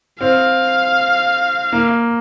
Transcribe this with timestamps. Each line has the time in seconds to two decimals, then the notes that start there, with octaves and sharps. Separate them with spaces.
0.20 C4 F5
1.73 A#3